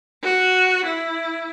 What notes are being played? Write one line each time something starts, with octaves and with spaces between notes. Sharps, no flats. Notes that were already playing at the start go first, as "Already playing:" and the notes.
F#4
E4